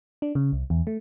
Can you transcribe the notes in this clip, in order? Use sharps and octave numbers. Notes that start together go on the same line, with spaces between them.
D4
C#3
C2
E2
A3